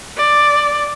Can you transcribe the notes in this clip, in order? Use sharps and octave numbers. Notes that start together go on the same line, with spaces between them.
D5